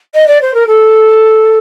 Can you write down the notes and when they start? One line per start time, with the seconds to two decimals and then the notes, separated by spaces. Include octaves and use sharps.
0.14 D#5
0.27 D5
0.41 C5
0.54 A#4
0.67 A4